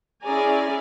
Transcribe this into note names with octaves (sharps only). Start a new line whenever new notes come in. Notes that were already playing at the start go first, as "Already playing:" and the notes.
C#4 E4 G#4 D5 G#5 A#5